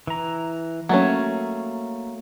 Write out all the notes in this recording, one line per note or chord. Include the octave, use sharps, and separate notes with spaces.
E3 A#5
F#3 A3 A#3 C#4